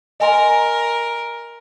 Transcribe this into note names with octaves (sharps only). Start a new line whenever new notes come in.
A#4 D#5 G#5 C6